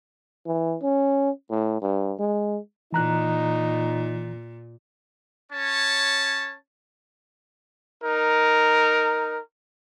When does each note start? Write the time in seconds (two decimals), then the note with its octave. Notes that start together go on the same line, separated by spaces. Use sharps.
0.47 E3
0.83 C#4
1.51 A2
1.82 G2
2.20 G#3
2.93 A#2 E3 D#4 A#5 F#6
5.51 C#4 C#5 A5
8.03 D#4 A#4